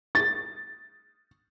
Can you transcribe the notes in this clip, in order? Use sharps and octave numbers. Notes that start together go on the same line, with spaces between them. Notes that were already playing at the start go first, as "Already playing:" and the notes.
A6